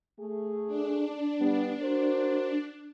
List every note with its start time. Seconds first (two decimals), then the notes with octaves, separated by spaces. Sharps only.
0.20 A3 G#4
0.67 D4
1.41 G3 B3
1.82 F#4 A#4 C5